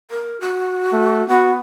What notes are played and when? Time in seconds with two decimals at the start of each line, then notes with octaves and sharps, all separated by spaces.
0.11 A#4
0.41 F#4
0.92 A3
1.29 B3 F#4